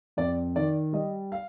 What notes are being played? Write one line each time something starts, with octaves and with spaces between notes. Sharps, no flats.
F2 D5
D#3 D5
G3 D#5
F5